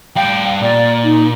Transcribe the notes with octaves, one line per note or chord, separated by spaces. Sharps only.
G3 F5 G5
A#2 D5
D#4